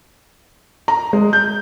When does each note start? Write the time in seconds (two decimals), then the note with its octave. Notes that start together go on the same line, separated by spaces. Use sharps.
0.88 A#5
1.13 G#3
1.33 G6